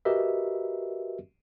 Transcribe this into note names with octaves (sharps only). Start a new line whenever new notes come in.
F#4 G4 A#4 B4 D#5 E5